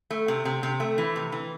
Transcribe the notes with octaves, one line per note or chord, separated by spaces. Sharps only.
A3
C3
C3
C3
A3
E3
C3
E3